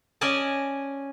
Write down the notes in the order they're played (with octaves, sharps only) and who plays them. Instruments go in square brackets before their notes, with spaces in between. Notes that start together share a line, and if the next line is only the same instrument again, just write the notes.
[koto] C#4 D5 D#5 G#5 A5